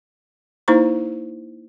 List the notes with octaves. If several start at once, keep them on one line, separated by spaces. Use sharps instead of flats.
A#3 D#4 E4 C5 A#5 C#6